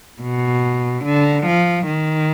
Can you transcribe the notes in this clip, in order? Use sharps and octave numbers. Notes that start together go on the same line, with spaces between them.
B2
D3
F3
D#3